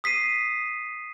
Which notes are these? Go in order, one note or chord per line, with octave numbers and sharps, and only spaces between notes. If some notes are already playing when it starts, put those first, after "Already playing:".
D#6 B6 C7 D#7